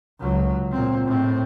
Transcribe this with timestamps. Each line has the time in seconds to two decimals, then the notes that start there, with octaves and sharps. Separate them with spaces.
0.20 C#2 F#3
0.71 A#2 C4
1.06 A2 C4